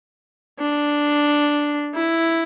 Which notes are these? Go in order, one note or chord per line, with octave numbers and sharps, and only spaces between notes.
D4
E4